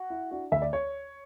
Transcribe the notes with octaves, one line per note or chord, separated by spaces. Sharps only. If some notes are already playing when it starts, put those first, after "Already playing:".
Already playing: F#4
E4
D4 F#4
D2 E5
D5
C#5